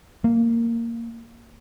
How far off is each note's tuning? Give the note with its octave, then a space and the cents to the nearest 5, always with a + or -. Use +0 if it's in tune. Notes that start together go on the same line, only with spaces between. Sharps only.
A#3 -10